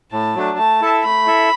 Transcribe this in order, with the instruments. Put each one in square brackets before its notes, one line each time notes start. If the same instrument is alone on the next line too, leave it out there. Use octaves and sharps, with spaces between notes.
[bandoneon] A2 [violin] A5
[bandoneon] F#3 A3 D4
[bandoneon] A3 [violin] A5
[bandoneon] E4 A4 E5
[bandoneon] A3 [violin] B5
[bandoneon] E4 A4 E5